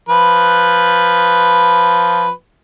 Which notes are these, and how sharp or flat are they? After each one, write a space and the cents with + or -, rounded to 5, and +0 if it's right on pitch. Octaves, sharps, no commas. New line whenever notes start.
F3 +0 B4 +0